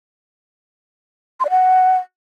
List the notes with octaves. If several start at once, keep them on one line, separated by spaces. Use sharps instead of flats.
C6
D5
F#5